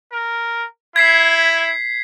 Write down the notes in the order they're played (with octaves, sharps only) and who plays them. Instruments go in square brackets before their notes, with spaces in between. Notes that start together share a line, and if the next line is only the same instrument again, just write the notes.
[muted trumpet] A#4
[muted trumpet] E4 [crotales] G#6 B6 C7